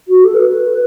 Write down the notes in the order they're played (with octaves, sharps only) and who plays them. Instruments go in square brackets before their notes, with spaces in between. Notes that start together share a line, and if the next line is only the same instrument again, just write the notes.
[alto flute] F#4
A4
B4